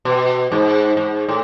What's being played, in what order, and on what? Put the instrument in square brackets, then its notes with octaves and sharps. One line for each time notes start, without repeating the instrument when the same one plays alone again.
[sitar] B2
G#2
G#2
A2